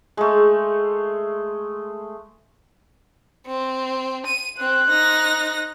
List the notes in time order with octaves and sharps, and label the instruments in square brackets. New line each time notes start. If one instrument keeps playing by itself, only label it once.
[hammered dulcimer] G#3 A3
[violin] C4
D#7
[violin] C4 [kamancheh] C5 F#6
[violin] D#4 A#6